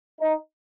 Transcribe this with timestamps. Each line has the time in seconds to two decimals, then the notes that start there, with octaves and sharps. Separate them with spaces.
0.20 D#4